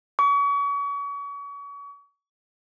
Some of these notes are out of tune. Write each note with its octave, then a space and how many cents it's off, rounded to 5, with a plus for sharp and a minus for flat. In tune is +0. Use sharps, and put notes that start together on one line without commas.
C#6 +35